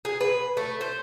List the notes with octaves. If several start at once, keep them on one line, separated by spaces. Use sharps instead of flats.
G#4
B4
A3
C5